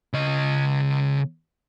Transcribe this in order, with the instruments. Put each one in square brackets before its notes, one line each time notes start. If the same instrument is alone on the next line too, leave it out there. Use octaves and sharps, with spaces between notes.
[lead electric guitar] C#3 D#5